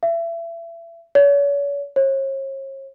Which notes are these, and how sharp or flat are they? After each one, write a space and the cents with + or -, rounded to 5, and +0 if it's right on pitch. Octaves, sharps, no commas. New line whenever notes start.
E5 +30
C#5 +40
C#5 -40